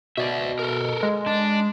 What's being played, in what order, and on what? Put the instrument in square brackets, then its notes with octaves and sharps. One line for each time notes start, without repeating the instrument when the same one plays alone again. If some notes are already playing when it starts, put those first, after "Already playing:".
[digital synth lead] B2 [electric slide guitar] D5 E5
[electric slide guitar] A4 A#4
[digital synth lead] G#3
[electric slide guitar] D4